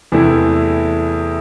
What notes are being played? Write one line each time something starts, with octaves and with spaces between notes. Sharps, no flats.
E2 C3 E3 A3 E4